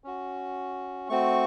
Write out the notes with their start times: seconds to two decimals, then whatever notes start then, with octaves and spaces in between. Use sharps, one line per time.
0.04 C#4 F#4
1.09 A3 C4 F#4 C#6